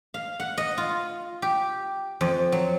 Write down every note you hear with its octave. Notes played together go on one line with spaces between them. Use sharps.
F5
F#5
D#5
F4
G4
F2
F#3